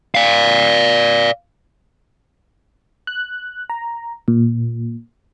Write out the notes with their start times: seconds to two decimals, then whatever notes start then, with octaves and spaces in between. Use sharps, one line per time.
0.15 D5 F5
3.07 F#6
3.70 A#5
4.28 A#2